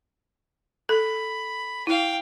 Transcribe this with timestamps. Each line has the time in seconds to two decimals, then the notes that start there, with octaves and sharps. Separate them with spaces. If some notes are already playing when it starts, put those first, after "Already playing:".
0.89 A4 B5
1.87 E4 F5 G5